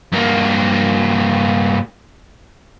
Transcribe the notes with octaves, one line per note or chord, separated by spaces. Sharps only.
G2 A#3